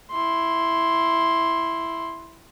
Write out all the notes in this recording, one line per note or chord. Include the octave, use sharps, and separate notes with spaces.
E4 C6